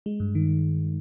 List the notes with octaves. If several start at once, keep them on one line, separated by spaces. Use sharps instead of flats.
G#3
G2
D#3